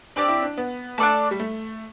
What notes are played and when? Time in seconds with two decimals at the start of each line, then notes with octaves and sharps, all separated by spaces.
0.16 C4 D4 G4 D5
0.28 E4
0.42 D4
0.58 B3
0.98 A3 D4 A4 D5 A5
1.31 G3
1.40 A3